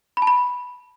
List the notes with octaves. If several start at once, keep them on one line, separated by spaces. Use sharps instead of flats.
B5
A5
B5